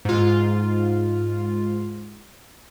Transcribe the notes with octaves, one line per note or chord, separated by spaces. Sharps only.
G#2 F4